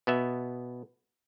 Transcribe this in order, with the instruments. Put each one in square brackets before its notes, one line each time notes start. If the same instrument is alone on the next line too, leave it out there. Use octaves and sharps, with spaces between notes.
[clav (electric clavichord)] B2 B3 E5